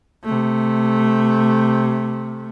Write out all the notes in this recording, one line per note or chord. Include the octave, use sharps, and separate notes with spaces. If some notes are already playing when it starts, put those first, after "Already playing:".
C3 A3